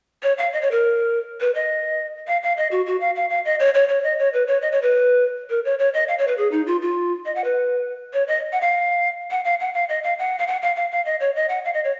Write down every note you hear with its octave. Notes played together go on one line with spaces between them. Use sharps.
C#5
F5
D#5
C#5
A#4
B4
D#5
F5
F5
D#5
F#4
F#4
F5
F5
F5
D#5
C#5
C#5
C#5
D#5
C#5
B4
C#5
D#5
C#5
B4
A#4
C#5
C#5
D#5
F5
C#5
B4
G#4
D#4
F4
F4
D#5
F#5
B4
C#5
D#5
F#5
F5
F#5
F5
F#5
F5
D#5
F5
F#5
F5
F#5
F5
F5
F5
D#5
C#5
D#5
F#5
F5
D#5
C#5